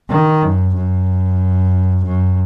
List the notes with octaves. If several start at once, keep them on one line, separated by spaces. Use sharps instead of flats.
D#3
F#2
F#2
F#2